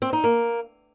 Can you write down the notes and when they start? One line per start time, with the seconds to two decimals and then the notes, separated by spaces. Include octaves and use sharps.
0.02 C4
0.13 D#4
0.24 A#3